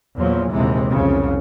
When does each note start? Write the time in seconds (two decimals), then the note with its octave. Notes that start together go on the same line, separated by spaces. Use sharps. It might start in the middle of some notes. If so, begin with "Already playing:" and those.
0.16 E2 A#2 F3 F#3
0.51 A#1 D#2 C3 E3 G#3
0.91 C2 F2 C#3